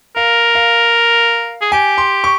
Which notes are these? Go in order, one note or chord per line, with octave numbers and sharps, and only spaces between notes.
A#4 F5
F5
G#4
G4 G#5
C6
C#6